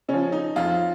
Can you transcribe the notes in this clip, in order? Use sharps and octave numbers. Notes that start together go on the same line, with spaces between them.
C#3 F3 C#4
D#4
F2 F4